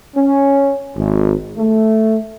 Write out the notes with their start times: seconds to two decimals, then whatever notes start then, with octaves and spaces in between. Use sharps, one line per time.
0.15 C#4
0.96 G#1
1.57 A3